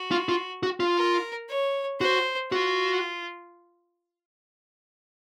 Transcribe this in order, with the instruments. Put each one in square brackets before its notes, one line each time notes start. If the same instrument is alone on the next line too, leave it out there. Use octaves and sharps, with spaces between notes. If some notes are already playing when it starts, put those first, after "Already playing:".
Already playing: [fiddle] F#4
[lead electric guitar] F4
F4
F#4
F4
[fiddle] A#4
C#5
[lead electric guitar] F#4 [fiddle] C5
[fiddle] F4 [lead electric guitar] F#4